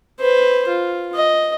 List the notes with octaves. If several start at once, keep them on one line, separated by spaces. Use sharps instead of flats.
B4 C5
F4
D#5